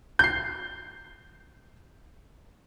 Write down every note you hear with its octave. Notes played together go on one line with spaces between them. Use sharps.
G6 C7